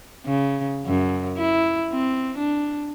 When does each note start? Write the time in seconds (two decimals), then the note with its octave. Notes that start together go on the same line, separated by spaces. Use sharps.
0.26 C#3
0.86 F#2
1.37 E4
1.92 C4
2.37 D4